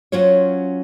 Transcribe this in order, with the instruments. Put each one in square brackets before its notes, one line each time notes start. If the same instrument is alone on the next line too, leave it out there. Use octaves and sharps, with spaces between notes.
[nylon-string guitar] F#3 C#4 F4 C5 C#5